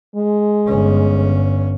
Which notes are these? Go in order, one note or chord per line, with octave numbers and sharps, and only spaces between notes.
G#3
G1 C#4